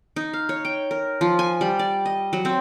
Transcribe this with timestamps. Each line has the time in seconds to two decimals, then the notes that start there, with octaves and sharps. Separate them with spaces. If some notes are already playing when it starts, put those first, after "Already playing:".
0.16 D#4
0.33 F5
0.49 C#5
0.65 G5
0.91 A#4
1.21 F3
1.39 G#5
1.61 G3
1.79 D5
2.06 D#5
2.33 F#3
2.45 C4